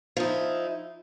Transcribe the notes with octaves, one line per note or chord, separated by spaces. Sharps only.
F3 D#4 E4